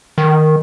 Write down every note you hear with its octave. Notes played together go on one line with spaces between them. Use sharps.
D#3